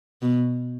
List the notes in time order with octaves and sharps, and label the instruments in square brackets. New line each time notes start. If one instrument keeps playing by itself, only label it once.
[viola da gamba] B2